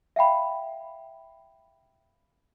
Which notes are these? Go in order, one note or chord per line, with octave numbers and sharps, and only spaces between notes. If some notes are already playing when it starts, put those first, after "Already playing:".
E5 F5 G5 B5